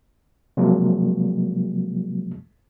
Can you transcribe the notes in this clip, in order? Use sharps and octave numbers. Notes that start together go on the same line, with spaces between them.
C3 F3 F#3 G#3 A#3